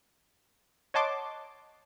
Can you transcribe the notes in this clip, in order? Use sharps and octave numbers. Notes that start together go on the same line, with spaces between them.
C#5 D#5 F#5 A5 C6 D6